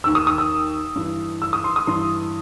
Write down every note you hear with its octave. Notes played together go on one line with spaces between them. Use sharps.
D#2 D#3 E6
D#6
D#6
E6
G2 E3
E6
D#6
C6
D#6
G2 E3 C6